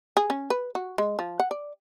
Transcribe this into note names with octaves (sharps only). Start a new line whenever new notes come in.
G#4
C#4
B4
F#4
G#3
F3
F#5
D5